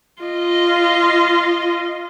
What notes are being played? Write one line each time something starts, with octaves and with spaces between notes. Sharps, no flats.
F4 D#5